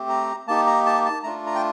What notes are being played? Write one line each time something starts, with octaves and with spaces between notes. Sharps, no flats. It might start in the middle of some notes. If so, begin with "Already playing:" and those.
Already playing: A3 C4 G4
A#5
A#3 D#4 G4 A5
A#5
A5
A5
A3 D4 F4 A#5
A#5
G5